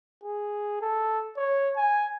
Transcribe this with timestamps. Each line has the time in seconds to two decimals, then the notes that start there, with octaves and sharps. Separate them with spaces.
0.24 G#4
0.82 A4
1.37 C#5
1.77 G#5